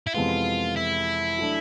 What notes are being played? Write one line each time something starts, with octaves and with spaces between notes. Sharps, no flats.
E4
F2 C3 E3 G#3 B3 F4
E4
F#3 A3 D4